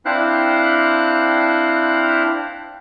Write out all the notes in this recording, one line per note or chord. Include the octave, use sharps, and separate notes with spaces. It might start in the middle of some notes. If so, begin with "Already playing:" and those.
C4 D4 E4 C5 F5 F#6